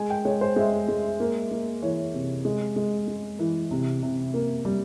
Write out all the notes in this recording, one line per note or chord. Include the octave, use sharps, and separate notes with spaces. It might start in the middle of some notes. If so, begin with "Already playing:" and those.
Already playing: G#3 G#5
G5
G#3 C#5
C5
G#3 E5
G#3
A#3
A#3
E3 C#5
C3
G#3
G#3
G#3
E3
C3
C3
A#3
G3